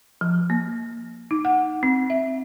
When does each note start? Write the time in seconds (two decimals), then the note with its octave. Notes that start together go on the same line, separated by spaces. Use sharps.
0.21 F3
0.50 A#3
1.31 D#4
1.45 F#5
1.83 C4
2.10 E5